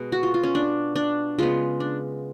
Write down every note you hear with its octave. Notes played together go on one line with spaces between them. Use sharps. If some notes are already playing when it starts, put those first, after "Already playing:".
Already playing: B2 G#3 B3
F#4
F4
F4
C#4
D4
D4
C#3 G#3 B3 F4
D4